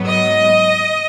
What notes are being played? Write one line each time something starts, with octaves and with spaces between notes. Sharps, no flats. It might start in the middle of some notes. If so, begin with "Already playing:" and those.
Already playing: G#2 F#3 B3
D#5